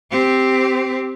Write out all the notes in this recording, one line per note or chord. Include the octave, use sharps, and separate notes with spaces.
C4 G4